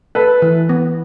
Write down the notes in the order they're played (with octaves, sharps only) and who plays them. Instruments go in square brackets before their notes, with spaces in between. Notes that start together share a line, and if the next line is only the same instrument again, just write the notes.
[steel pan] A4 [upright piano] B4
[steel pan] E3
B3